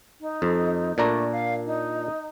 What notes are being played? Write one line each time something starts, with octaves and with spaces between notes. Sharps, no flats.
D#4
F2
A#2 A3 D4 A#5
F5
D#4